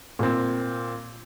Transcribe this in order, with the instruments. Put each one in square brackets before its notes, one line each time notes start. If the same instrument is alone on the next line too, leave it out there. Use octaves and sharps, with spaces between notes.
[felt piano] A#2 C4